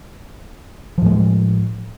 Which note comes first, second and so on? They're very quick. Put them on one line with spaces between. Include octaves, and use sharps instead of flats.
F3 A2 A3 G#3